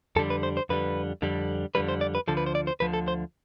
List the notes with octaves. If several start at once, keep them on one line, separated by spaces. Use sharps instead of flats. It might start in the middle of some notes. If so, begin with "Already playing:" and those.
F2 D3 G3 A4
B4
C5
C5
F2 D3 G3 B4
F2 D3 G3
F2 D3 G3 B4
C5
D5
B4
D2 D3 F3 A4
B4
C5
D5
C5
D2 D3 F3 B4
A4
C5